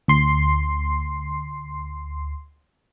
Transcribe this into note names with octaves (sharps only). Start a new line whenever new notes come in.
D2 C6 C7